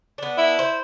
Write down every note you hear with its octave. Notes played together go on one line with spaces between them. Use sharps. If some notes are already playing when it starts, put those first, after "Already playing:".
B3 D4
E4
C5